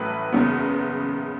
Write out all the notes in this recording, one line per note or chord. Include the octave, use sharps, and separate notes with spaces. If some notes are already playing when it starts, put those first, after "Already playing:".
Already playing: A1 A2 F#3 A3 B4
F#1 E2 C#3 F#3 B3